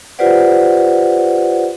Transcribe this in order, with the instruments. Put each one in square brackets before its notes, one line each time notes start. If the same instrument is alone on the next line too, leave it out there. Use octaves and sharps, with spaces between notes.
[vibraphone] F4 G4 B4 C5 D5 F#5